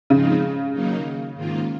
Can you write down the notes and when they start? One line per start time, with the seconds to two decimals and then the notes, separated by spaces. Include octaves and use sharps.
0.10 G#2 C#3 F3 C4 D#4
0.74 D#3 F#3 A#3 D#4
1.36 G#2 D#3 A#3 F4